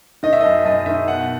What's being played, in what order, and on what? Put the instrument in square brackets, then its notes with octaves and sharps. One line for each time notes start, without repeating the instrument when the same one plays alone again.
[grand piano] D#3 D#5
E5
F#2 D#5
F#2 D#5
D#3 E5
B2 F#5